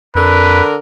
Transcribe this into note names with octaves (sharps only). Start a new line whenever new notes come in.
F2 D3 A#4 B4